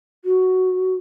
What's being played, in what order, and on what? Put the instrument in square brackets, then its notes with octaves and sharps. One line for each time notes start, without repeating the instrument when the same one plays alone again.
[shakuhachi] F#4